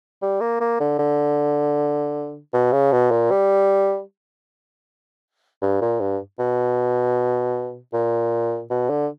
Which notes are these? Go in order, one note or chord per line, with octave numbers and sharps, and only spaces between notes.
G3
A#3
A#3
D3
D3
B2
C#3
B2
A#2
G3
G2
A#2
G2
B2
A#2
B2
D3